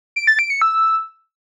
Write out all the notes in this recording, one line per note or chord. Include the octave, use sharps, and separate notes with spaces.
D7
A6
D7
C#7
E6